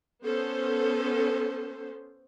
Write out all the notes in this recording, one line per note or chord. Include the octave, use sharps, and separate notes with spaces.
B3 C#4 A4 C5